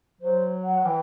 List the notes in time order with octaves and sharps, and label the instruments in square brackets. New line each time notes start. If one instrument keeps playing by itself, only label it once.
[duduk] F#3 [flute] C5
[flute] F#5
[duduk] E3 [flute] G5